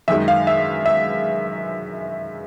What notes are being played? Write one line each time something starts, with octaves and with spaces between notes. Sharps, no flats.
F#2 D#3 G#3 E5
F5
E5
E5